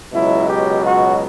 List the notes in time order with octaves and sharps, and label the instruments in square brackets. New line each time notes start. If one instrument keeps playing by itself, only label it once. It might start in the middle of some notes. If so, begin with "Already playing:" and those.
[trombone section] C#2 B2 F#3 E4
G4
F#4